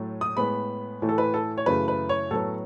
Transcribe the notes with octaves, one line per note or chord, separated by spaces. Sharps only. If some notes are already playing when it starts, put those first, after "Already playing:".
Already playing: A2 F#3 A3
D#6
A2 G#3 B3 B5
A2 E3 A3
A4
B4
A4
C#5
F#2 C#3 E3 A3 B4
B4
C#5
A2 F#3 B3 A4